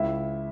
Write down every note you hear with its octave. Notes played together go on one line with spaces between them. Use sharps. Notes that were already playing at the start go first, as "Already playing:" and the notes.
Already playing: C#2 E4 E5